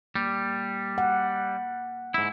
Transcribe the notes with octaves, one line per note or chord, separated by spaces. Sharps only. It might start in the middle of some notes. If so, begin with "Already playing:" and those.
G3 A#3
F#5
G#2 E4